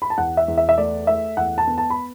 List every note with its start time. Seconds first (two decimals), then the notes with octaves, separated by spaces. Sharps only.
0.02 B5
0.10 A5
0.17 E2 F#5
0.37 E5
0.48 E2
0.58 E5
0.69 E5
0.78 A3 D5
1.07 A3 E5
1.37 E2 F#5
1.58 A5
1.67 B3
1.78 A5
1.90 B5